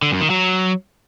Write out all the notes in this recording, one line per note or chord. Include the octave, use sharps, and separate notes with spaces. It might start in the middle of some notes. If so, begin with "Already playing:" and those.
D3
F#2
D#3
F#3